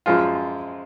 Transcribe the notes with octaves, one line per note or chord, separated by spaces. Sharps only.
F#2 F3 G#3 F4